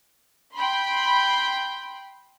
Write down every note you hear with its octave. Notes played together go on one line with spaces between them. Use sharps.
G5 B5 C6